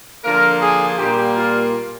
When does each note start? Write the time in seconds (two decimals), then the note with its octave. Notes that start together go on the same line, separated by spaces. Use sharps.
0.23 D3 F3 A#3 A#4
0.60 G#4
0.97 A#2 G3 A#3 G4
1.34 F4